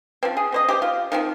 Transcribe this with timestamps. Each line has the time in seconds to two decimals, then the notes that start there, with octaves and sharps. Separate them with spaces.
0.23 F3 C4
0.37 G#4
0.52 C4 C5 D#5
0.68 G4 C5
0.82 F4
1.12 D#3 F3 C4